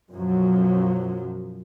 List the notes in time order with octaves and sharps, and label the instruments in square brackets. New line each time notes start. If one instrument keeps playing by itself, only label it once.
[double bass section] F#2 B2 F3 F#3